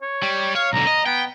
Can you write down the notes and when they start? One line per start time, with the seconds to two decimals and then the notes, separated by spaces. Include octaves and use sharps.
0.02 C#5
0.23 G3
0.55 C#5 F5
0.73 B1 D3 A#5
0.87 D#5
1.06 B3 G5